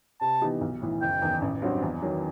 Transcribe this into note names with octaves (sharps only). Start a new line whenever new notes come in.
C3 A5
E3 B3 D#4 G4
B1
A2 E3
F#1 G5
E2 D#3
A1
G2 F#3 C4 F#4
E2
D#3 F#3